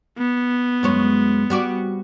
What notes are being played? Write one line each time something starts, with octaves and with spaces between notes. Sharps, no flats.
B3
F#2 G#3 C#5
G3 F#4 D5